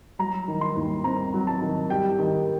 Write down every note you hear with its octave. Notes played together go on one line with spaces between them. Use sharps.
F#3 A#5
D#3
C6
D#2
C4 A#5
F#3
A5
D#3
G3 G5
D#3